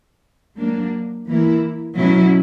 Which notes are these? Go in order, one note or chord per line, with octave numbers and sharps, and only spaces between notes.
F#3 A#3 D4
E3 A#3 E4
B2 F#3 C#4 E4